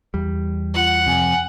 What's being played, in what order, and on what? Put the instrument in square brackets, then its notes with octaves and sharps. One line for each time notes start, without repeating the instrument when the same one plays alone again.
[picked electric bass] E2 G3
[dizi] F4 [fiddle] F#5
[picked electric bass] F2 C3 [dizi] G#5